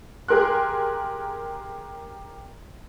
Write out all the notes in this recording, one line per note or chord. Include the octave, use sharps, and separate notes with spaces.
G4 G#4 A#4 C6 F#6